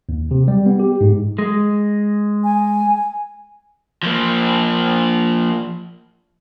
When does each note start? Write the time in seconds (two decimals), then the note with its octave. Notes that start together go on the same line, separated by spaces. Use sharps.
0.09 D#2
0.31 C3
0.48 G3
0.66 B3
0.80 G4
1.01 G#2
1.39 G#3
2.44 G#5
4.03 F3 A#3